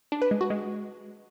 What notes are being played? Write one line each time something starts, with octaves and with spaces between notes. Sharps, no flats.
D4
B4
G#3
F#4
G#3